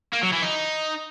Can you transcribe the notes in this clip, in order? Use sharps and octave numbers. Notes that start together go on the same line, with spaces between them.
A#3
F#3
E3
D#4